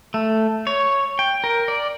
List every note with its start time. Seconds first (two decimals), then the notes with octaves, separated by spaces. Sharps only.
0.14 A3
0.67 C#5
1.19 G5
1.44 A#4
1.68 D5